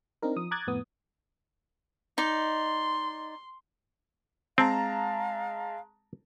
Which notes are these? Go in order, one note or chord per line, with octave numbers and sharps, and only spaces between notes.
C4 D4 D#4 A#4
F3 D#6
A#5 D6 D#6 F#6 G#6 A6
F2 A2 B3 D#6
D#4 D5 C6
G#3 C4 F5 A5 A#5